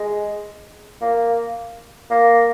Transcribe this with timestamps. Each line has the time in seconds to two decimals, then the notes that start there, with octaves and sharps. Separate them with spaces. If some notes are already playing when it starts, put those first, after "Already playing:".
Already playing: G#3
1.01 A#3
2.10 A#3